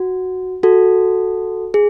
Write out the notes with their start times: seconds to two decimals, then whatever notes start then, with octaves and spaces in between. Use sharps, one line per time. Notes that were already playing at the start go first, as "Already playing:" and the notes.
Already playing: F#4
0.63 F#4 A4
1.74 G#4